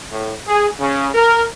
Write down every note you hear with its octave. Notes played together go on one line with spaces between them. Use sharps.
A2
G#4
C#3
A#4